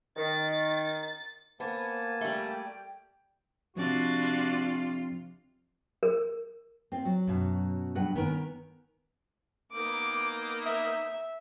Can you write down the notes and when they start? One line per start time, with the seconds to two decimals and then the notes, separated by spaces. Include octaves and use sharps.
0.17 D#3 A6
1.60 A#3 B3 C5 G#5 A5
2.21 G3 A3 G5
3.77 C3 F3 C4 D4 F4 F#4 D5
6.03 A#4
6.92 C4 F4
7.05 F#3
7.28 F#2 B2
7.95 G2 F#3 F#5
8.16 D#3 B3 C#4 A#4
9.72 A#3 B3 D#4 D6
10.62 E5